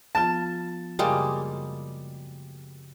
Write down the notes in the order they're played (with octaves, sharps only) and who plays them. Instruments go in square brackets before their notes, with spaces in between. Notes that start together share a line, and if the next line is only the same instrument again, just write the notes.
[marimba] F3 B3 F4 [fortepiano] A5
[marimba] F#2 C#3 [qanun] G3 G#3 A#3